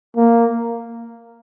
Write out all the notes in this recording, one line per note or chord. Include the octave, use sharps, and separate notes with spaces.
A#3